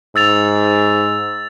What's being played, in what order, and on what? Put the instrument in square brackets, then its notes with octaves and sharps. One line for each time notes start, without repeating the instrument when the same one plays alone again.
[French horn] G#2 [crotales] E6 A6 F7